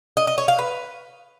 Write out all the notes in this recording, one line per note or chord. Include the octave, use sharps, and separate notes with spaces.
D#5
D#5
C#5
F5
B4